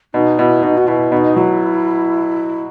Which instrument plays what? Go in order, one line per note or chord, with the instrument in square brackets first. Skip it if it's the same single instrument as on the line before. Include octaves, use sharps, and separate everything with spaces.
[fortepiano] B2 [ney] D#4
[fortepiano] B2 [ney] E4
[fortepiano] B2 [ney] D#4
[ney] F#4
[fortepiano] B2 [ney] E4
[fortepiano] B2 [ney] D#4
[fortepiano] F#3 [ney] E4